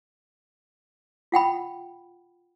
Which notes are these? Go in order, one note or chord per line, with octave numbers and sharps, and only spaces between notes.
F4 F#5 G5 B5